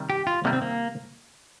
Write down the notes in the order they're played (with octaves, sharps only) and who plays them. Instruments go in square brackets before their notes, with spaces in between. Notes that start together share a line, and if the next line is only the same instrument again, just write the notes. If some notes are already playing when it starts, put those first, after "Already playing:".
Already playing: [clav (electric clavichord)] C3 D#3 G3
[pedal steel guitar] G4
F4
[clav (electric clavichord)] C3 D#3 G3 [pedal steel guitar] A#3
[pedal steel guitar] C4
A#3